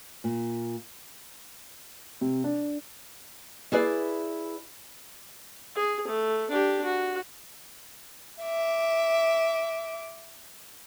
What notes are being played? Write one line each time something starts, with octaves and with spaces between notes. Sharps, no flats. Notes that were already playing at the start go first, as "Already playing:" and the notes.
A#2
C3
D4
E4 G#4 B4 D5
G#4
A3
D4 G4
F#4
E5 D6